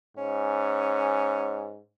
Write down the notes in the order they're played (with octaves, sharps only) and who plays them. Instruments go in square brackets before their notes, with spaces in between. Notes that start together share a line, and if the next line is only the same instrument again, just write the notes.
[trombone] G#2 [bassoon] C#4